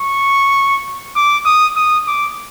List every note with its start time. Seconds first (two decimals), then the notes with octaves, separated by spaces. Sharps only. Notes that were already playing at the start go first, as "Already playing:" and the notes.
Already playing: C#6
1.16 D6
1.45 D#6
1.76 D#6
2.07 D6